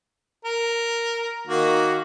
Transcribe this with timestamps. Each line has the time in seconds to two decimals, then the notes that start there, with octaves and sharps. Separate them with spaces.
0.45 A#4
1.47 D#3 A#3 F#4